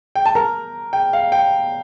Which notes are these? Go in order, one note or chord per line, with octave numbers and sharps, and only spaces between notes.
G5
A5
A#4 A#5
G5
F5
G5